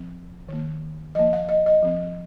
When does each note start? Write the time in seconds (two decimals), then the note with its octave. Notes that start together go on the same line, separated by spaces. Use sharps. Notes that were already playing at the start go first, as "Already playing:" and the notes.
Already playing: F3 C4
0.49 D#3 A#3
1.15 F3 A#3 D#5
1.33 F5
1.49 D#5
1.66 D#5
1.83 F3 C4